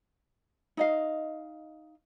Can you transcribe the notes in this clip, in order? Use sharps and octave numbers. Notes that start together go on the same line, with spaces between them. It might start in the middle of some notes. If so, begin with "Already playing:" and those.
D#4 D#5 F5